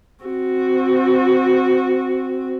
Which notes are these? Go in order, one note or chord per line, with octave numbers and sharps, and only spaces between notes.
C4 F#4